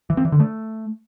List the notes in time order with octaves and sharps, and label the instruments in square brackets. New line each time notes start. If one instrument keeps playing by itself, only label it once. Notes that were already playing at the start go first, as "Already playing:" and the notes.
[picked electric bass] E3
C4
E3
D3
A3